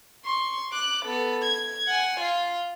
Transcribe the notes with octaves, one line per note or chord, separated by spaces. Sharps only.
C6 C#6
D6 F#6
B3 A4
G#6
F#5 G#5
F4